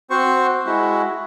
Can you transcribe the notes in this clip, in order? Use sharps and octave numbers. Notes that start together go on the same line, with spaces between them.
C4 F#4 C5 C#6
G#3 E4 F#4